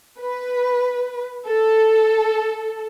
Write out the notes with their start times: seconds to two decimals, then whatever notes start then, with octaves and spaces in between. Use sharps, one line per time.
0.20 B4
1.48 A4